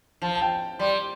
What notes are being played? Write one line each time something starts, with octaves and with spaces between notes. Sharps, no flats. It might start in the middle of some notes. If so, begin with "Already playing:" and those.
F3 A5
A5
G5
G3 C6